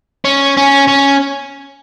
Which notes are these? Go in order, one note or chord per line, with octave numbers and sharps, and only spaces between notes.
C#4
C#4
C#4